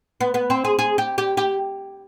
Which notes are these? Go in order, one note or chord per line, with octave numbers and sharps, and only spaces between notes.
B3
B3
C4
G#4
G#4
G4
G4
G4